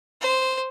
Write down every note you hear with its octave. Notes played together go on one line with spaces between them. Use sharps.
C5